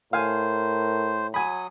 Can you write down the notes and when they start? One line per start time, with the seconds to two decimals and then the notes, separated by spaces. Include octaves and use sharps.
0.13 A2 A#4 C5 F5 G#5
1.34 F#3 G#5 B5 D#6